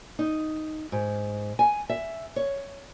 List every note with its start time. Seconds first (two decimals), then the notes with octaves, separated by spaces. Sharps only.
0.19 D#4
0.92 G#2
1.59 G#5
1.89 E5
2.36 C#5